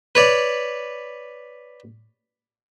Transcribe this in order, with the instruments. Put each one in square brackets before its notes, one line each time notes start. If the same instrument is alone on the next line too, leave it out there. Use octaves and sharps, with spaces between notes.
[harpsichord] B4 C#5 D5